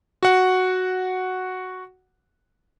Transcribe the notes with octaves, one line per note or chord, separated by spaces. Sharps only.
F#4 F#5